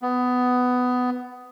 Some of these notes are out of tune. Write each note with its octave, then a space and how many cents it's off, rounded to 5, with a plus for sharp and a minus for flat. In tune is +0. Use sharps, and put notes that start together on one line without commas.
B3 +15